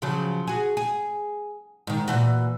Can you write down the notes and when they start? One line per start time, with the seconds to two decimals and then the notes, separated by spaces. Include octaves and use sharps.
0.02 C#3 F3 F#3
0.47 F#4 G#4
0.77 G#4
1.87 G#2 D#3
2.08 A#2 E3 F#4